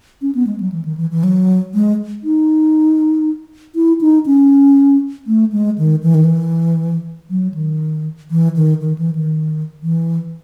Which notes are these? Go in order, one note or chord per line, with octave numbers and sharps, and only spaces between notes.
C#4
B3
G#3
F#3
E3
D#3
E3
E3
F#3
G#3
D#4
E4
D#4
C#4
A3
G#3
D#3
E3
D#3
E3
F#3
D#3
E3
D#3
D#3
E3
D#3
E3